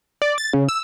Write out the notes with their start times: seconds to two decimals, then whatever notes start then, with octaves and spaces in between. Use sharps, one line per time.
0.22 D5
0.38 A6
0.53 C#3
0.69 E6